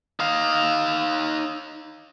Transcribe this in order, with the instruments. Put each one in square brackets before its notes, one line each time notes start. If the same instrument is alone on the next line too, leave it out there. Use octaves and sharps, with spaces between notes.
[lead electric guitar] D#4 F5